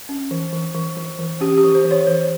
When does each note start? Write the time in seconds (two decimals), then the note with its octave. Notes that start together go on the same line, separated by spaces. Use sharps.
0.09 C#4
0.31 E3
0.53 E3
0.75 E3
0.97 E3
1.19 E3
1.41 C#4 G4
1.58 G4
1.64 E3
1.75 C5
1.85 E3
1.91 C#5
2.07 E3 C5